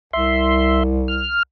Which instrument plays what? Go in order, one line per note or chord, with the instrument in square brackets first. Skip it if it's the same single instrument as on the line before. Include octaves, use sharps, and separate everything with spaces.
[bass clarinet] C2 [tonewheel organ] E5 C6
[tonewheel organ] F6